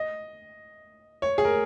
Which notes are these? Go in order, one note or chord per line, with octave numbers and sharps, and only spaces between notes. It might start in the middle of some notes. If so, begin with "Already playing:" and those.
Already playing: D#5
C#5
G#4
A#4